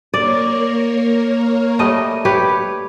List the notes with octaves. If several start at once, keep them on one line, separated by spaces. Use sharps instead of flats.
A#3 A#4 C#5 D5
G3 A3 D#5
G4 B4 C#5